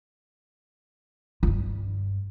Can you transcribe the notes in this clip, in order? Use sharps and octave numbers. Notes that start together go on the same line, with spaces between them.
G2 F4